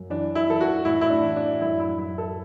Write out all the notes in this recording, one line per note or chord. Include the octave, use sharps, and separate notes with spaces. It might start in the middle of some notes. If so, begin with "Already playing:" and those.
Already playing: F#2
E3 D4
E4
E3 A4
F#4
A2 E4
E4
D4
E3
D4
F#2 E4
E4
F#2 E4
A4